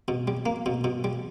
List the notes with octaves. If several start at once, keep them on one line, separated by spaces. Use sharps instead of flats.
B2
G3
A#3
B2
B2
G3